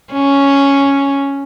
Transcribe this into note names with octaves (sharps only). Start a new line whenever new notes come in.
C#4